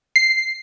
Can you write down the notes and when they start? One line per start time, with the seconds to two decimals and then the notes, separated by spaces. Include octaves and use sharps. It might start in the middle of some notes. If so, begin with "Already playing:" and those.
0.16 C7